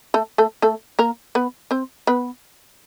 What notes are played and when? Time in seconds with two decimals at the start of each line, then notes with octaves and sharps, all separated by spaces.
0.14 A3 A4
0.38 A3 A4
0.62 A3 A4
0.99 A#3 A#4
1.35 B3 B4
1.71 C4 C5
2.07 B3 B4